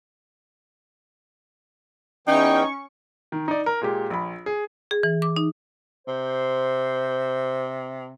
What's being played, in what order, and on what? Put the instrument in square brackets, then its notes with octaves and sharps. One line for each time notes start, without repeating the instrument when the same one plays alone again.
[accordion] E2 E3 G5 [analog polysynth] C#4 C#6 [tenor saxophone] D#4
[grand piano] D#3
D#4 D5
A#4
A#2 G#3 G4
A#1 B5
G#4
[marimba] G#4
E3
D6
D#4
[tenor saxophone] C3 [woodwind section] C5